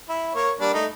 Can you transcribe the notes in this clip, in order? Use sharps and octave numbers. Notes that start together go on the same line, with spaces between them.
E4
A#3 C#5
G3 A#3 D4
A3 D#4